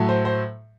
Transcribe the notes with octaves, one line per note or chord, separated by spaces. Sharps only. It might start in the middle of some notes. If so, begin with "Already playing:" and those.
Already playing: A2 F#3 A3
C5
C5